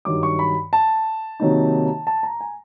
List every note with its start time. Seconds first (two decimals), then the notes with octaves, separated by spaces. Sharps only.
0.05 G2 D#3 F#3 D6
0.23 C#6
0.39 B5
0.73 A5
1.40 C3 D#3 F#3 A#3 D#4
2.07 A5
2.23 A#5
2.41 G#5